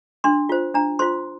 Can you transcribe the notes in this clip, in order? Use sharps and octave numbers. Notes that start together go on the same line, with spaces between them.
D4 C6
F4 C5
D4 A#5
F4 C5 C6